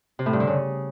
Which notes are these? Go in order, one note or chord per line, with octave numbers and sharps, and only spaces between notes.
C3
A2
G2
D3
C#3